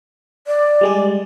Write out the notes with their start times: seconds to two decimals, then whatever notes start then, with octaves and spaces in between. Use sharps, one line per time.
0.47 D5
0.81 G3 G#3 G#4